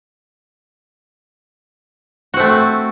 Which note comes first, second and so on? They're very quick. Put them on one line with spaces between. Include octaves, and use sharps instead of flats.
F#4 C4 A3